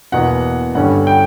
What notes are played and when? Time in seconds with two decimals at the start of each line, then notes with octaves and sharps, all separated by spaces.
0.12 E2 B2 A#3 F#5
0.75 G2 D3 G3 C#4 F#5
1.07 G5